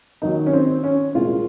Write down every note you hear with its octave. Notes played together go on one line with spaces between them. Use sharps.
D#2 D#3 F#3 D#4
C#4
C4
C#4
C2 A#2 G#3 F4